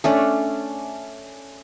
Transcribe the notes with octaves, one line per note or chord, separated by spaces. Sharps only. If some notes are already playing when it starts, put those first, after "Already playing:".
A3 C#4 D4